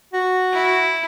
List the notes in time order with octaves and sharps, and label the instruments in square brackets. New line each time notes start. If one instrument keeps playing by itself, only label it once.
[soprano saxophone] F#4
[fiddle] E4